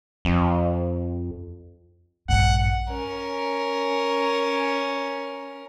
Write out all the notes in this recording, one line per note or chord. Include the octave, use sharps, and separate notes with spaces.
F2
A#1 G2 F#5
C#4 A#4